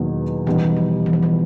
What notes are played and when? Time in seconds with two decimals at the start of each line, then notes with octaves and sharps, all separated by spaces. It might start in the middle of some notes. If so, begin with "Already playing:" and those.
Already playing: E2 B2 D#3 F#3 A#3 D#4
0.46 B2 E3 G3 B3 D#4 G4
0.65 E3
0.77 F3
1.06 E3
1.13 F3
1.23 E3